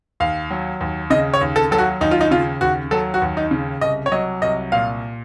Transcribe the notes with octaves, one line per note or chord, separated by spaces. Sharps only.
D#2 F5
F#3
D#2
C#3 D#5
C#5
D#2
A4
F#3 A4
F#4
D#2 D#4
F4
D#4
C#3 F4
D#2 F#4
F#3 A4
F#4
D#2
D#4
C#3
C2 D#5
C#5
F#3 D#5
C2 D#5
A#2 F5